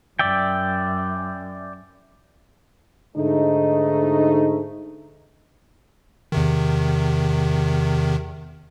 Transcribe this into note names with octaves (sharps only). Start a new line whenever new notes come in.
F#2 D5 E5 G5
G#2 D3 A3 D#4
E2 C3 D#3